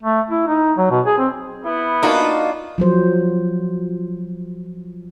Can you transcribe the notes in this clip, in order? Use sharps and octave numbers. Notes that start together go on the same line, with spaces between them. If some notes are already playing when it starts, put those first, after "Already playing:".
A3
E4
D#4
F#3
B2
G#4
C4
B3 E4
A#3 D4 D#4 F4 F#4 A#4
F3 F#3 C5